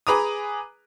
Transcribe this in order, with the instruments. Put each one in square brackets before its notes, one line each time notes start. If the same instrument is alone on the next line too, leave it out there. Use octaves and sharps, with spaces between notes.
[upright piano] G#4 B4 A#5 D6 D#6